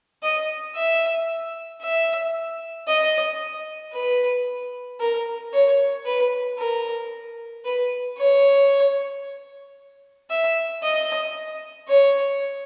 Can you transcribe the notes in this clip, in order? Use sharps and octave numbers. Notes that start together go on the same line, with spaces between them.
D#5
E5
E5
D#5
B4
A#4
C#5
B4
A#4
B4
C#5
E5
D#5
C#5